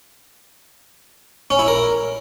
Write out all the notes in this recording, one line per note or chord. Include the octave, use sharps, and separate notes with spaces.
C#4
E4
A#4